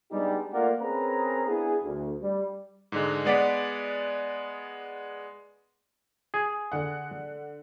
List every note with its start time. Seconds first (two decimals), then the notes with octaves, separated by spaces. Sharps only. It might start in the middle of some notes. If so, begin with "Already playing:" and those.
0.11 G3 G#3 B3 D4 D#4 G4
0.52 A3 A#3 F4 A#4 D5 F#5
0.80 C4 C#4 G#4 A#4 B4 A#5
1.46 B3 D4 E4 G#4
1.82 D2
2.22 G3
2.92 G#2 D3 G#3
3.25 G#3 B3 D5 F#5 D6 B6
6.34 G#4
6.72 D3 F#5